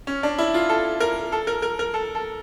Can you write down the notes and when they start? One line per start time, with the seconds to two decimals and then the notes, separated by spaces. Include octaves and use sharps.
0.07 C#4
0.23 D4
0.38 E4
0.54 F4
0.69 A4
1.00 A#4
1.32 A4
1.47 A#4
1.62 A#4
1.79 A#4
1.94 A4
2.15 A4